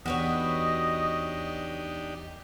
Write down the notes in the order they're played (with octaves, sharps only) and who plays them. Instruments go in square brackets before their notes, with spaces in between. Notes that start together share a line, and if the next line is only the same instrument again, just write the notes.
[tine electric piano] E2 [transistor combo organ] D4 D#4 G4 [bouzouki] F#4 B4 C#5 [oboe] D#5